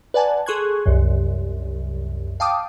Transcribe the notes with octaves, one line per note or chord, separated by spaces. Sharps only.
B4 D5 F#5 G#5 A5
G#4 A4 C6 C#6 F#6 G#6
C2 F#2
F5 G5 A5 D6 D#6